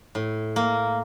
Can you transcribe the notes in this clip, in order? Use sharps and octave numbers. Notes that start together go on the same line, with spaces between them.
A2
A#3